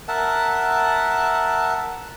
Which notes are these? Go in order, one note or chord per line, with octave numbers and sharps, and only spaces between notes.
A#4 E5 F#5 A5